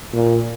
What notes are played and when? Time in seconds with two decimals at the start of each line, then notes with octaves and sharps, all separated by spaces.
0.13 A#2